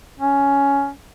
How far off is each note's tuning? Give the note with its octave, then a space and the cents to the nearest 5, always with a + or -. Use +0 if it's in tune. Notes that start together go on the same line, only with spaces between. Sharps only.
C#4 +10